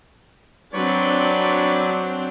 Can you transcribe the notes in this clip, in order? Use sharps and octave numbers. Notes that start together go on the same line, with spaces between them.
F#3 C4 D4 B4 C#5 D5